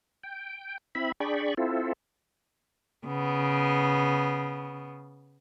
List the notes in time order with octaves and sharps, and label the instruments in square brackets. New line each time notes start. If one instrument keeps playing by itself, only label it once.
[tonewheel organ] G5
C4 E4 E5 B5
D4 G#4 D5 G5 B5 C#6
C4 E4 F4 A4
[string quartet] C#3 B3